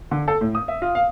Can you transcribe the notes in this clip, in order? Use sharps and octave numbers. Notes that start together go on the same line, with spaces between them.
D3
A4
A2
D#6
E5
F4
F5